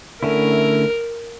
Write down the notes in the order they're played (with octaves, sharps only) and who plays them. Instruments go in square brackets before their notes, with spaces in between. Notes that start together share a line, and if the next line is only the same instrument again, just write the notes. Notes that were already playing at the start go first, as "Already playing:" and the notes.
[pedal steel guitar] D3 A3 C#4 E4 [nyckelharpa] A#4